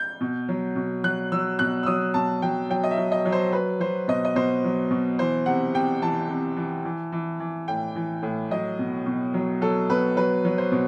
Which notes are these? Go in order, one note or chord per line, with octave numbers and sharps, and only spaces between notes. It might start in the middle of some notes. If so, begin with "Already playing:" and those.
Already playing: G6
B2
F#3
B2
F#3 F#6
F#3 E6
B2 F#6
E6
F#3 D#6
B2 A5
F#3 G5
F#3 G5
D#5
E5
F#3
D#5
F#3
C5
F#3 B4
F#3 C5
B2 D#5
D#5
B2 C5
F#3
B2
E3 C5
C3 F#5
C3 G5
E3 A5
C3
E3
E3
E3
E3
A2 G5
E3
A2
F#3 D#5
B2
B2
F#3
F#3 A4
B2 B4
F#3 B4
F#3
C5
B2